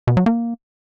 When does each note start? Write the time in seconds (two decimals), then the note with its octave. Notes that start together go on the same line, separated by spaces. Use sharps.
0.07 B2
0.17 F#3
0.26 A#3